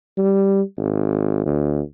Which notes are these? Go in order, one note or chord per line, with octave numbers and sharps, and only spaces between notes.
G3
G#1
D2